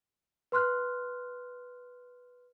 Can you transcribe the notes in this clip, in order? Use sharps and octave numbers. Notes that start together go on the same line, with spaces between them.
B4 C6 F6 F#6